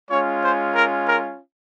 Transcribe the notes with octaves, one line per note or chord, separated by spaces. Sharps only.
G#3 C#4 F4 C#5
C5
A#4
A#4